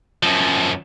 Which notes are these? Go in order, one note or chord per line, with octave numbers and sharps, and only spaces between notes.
F#2 F3